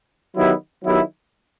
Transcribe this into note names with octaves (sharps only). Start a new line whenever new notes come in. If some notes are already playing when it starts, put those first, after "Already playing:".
D#3 F#3 B3 E4 G4
D#3 F#3 B3 E4 G4